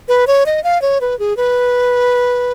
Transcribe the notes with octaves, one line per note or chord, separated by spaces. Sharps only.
B4
C#5
D#5
F5
C#5
B4
G#4
B4